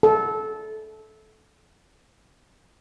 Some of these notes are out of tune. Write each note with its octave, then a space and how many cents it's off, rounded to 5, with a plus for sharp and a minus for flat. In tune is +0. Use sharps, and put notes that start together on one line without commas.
A4 -20